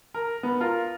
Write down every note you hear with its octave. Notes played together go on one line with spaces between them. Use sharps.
A#4
B3
F4 A#4